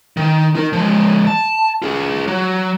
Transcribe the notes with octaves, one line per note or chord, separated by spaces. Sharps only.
D#3
D#4 A#4
F3 G#3
A5
F4 G#4
F#3